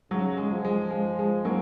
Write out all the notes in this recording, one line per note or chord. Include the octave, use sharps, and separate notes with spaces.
C#3 F#3
G#3
F3
G#3
G#3
G#3
F#3 A#3